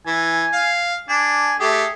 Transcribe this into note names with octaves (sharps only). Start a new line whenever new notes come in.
E3 G#5
F5
D4 G#5
A3 G4 G#4